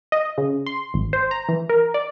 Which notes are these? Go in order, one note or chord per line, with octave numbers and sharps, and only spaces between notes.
D#5
C#3
C6
G#1
C5
A#5
E3
A#4
D5